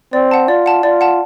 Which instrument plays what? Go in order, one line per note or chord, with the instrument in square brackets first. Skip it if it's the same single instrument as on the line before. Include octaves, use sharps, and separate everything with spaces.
[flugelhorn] C4 [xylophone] D5
[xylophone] F#5 A5
[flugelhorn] F4 [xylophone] D5
[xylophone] F#5 A5
[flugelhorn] F4 [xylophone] D5
[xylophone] F#5 A5